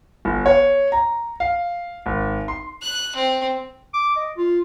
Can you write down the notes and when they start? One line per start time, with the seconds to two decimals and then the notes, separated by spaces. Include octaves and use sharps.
0.25 G1
0.46 C#5
0.92 A#5
1.40 F5
2.06 G#1
2.48 C6
2.82 F#6
3.15 C4
3.94 D6
4.16 D#5
4.37 F4